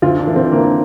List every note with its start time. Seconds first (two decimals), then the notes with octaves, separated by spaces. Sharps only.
0.02 D2 F4
0.19 D4
0.27 E3
0.36 C4
0.52 D2 A#3